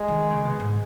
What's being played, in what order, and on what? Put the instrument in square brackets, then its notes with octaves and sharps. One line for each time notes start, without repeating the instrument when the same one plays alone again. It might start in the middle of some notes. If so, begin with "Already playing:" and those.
Already playing: [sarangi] G#3
[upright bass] D#3
C#3
B2
G#2